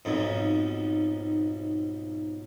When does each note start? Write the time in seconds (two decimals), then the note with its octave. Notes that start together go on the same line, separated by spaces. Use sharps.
0.05 B1 F2 G#2